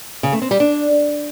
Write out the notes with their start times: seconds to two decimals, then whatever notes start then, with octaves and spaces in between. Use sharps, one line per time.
0.23 C#3
0.32 A3
0.42 C4
0.51 G3
0.60 D4